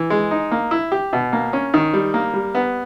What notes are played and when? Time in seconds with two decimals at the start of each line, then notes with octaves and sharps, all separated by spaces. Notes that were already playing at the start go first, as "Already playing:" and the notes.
Already playing: E3
0.10 G#3
0.31 D#4
0.52 A#3
0.71 E4
0.92 G4
1.13 B2
1.33 A#3
1.53 C#4
1.74 D#3
1.93 G3
2.14 A#3
2.34 G3
2.55 B3